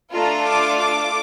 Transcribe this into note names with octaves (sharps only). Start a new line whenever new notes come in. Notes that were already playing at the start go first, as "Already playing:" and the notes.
A3 D4 F4 A4 A#5
D6
D6